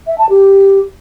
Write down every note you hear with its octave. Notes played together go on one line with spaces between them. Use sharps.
E5
A5
G4